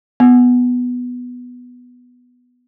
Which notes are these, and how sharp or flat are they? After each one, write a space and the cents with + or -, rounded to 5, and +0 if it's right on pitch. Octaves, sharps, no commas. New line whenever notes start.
B3 +0